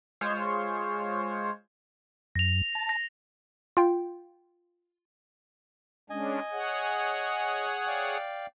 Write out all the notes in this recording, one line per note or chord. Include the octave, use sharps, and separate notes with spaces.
G#3 F4 C5 C#5
F#2 A#6 F7
A5
A#6
F4 G5
G#3 C#4 D4 D#5 G#5
G#4 C#5 F#5
D5 F5 G5